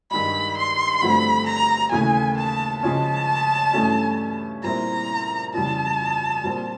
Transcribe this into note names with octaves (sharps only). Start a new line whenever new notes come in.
G2 D#3 G#3 B5
C6
G2 D3 F3 A3 C4 B5
A#5
D#2 C#3 E3 A3 G#5
A5
C#3 F3 G#3 C#4 A5
G2 E3 A3 C#4
A#2 G3 C4 E4 A#5
F2 C#3 E3 G3 A5
A#2 G3 C4